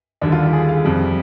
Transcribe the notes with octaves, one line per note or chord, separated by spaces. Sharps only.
D#2 D3 G3 D4
F4
G4
G#4
F5
F2 C3 G3